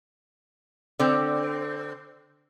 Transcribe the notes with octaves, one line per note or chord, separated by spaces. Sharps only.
D3 C4